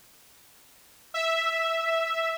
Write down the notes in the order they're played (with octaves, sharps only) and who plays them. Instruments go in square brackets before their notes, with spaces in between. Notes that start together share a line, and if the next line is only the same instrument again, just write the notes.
[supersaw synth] E5